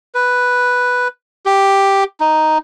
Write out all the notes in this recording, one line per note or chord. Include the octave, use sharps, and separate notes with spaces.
B4
G4
D#4